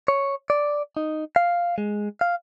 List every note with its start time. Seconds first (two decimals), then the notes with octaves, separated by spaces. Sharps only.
0.08 C#5
0.50 D5
0.97 D#4
1.36 F5
1.78 G#3
2.21 F5